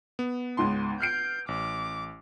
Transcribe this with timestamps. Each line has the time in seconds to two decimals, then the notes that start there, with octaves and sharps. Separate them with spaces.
0.19 B3
0.57 C#2 G#2 C6
1.00 F6 G6 C7 D7
1.48 A1 D6